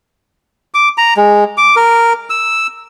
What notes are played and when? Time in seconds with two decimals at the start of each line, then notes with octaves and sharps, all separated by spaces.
0.74 D6
0.98 A#5
1.17 G#3
1.57 D6
1.76 A#4
2.30 E6